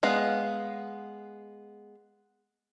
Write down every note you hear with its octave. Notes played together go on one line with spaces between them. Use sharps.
G#3 B3 F5